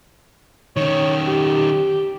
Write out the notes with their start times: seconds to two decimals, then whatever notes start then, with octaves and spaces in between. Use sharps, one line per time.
0.77 D#3 C#4 C#5
1.27 G4